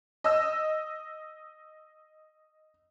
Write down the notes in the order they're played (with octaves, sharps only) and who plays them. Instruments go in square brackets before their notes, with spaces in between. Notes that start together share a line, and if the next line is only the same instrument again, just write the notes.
[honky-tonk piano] D#5 E6